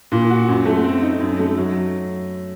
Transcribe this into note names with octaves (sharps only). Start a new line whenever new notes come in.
A#2
F#4
F#2
A3
C4
D#4
F#2
A3
F#3